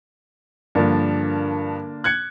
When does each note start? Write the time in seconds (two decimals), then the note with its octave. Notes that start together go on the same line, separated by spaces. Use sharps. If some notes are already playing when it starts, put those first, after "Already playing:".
0.75 G2 D3 F3 A#3 D4
2.04 F#6 G#6 C#7